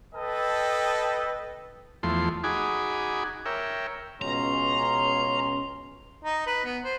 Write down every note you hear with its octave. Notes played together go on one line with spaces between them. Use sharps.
A4 B4 D#5 G5 A5
E2 F3 A3 C6
D#4 F#4 G#4 G#5 B5 D6
A#4 C#5 E5 G5
C#2 B2 C#4 A#5 C6
D#4
B4
B3
C5